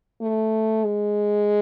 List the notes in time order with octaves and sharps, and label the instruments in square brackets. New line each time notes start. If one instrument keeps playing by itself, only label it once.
[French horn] A3
G#3